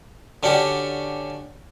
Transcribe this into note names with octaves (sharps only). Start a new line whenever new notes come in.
D3 C#4 D4 F#4 G4